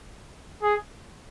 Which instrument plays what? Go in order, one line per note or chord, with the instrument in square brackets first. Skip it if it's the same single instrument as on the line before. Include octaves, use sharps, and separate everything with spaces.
[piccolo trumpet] G#4